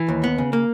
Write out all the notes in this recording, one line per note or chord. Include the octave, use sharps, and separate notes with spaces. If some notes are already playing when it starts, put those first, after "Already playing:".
Already playing: E3
D#2
B3
C#3
A#3